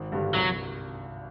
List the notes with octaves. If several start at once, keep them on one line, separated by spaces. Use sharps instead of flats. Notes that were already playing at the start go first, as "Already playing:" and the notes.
Already playing: G#1
G2 D3 G3
C2 F#3